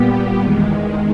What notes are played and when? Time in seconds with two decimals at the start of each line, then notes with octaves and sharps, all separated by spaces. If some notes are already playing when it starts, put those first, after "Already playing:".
Already playing: A#2 G3 B3 G4
0.39 E2 D#3 G#3